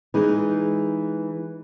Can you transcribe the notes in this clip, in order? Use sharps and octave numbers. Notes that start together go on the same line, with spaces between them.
E3 G#3 D#4